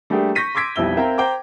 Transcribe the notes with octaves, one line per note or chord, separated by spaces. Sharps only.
G3 A3 A#3 D4 G4 G#4
C#6 G6 A#6 B6 D#7
C6 D6 E6 G#6 B6 D7
B1 F2 G3 E4 E6 G7
C4 A#4 E5 F5 G5 A#5
C5 G5 A#5 D6